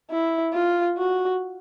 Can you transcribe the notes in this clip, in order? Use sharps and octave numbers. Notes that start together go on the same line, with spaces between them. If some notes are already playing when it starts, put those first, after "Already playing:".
E4
F4
F#4